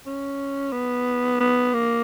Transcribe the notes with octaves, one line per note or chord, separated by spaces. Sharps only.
C#4
B3
B3
A#3